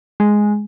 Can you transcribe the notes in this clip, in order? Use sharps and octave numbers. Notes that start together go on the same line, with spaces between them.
G#3